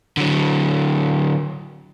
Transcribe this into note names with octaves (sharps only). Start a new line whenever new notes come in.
D3 F#3